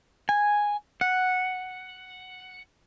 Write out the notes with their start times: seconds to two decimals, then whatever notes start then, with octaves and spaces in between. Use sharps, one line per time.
0.29 G#5
1.01 F#5